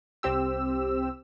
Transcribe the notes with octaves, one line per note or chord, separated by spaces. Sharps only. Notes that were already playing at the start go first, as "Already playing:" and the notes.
C2 C4 G4 E6